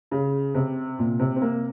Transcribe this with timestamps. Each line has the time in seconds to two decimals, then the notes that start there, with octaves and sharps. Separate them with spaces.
0.11 C#3
0.55 C3
0.99 A#2
1.19 C3
1.36 C4
1.41 A#3